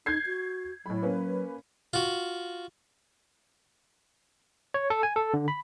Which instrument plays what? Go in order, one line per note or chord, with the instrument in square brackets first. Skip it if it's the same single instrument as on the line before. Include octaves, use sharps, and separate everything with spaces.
[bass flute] D#4 [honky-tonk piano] G6 G#6 C7
[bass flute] F#4
[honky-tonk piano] A2 B5 [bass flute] F#3
[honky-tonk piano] A#3 C#4 B4
[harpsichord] F4 F#4
[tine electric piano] C#5
A4
G#5
A4
D3
B5